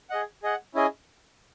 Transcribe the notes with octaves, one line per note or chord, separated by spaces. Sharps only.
G#4 D#5 F#5
G#4 D#5 F#5
C#4 E4 G#4 D#5 G#5